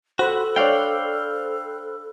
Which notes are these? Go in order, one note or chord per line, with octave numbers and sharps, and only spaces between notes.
F#4 A4 C5 B5 F#6
D4 C#5 D5 F5 G5